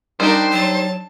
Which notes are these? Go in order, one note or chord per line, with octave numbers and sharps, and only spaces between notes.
G3 D4 D#4 G4 A#4 C5
F#3 A5